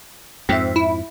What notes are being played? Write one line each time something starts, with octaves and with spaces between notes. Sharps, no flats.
F2 G#2 C4 E5
E4